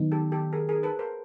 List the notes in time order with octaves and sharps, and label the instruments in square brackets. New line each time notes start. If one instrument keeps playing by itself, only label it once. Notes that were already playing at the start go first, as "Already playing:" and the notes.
Already playing: [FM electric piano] D#3 F#3 B3 D#4
[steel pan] G4 A4
G4 A4
G#4 A#4
G#4 A#4
A4 B4
A#4 C5